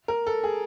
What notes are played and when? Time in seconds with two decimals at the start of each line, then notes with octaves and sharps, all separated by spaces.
0.08 A#4
0.27 A4
0.44 G#4